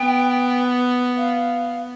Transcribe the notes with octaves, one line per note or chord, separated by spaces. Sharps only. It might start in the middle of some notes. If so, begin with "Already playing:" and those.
Already playing: B3 G5
F5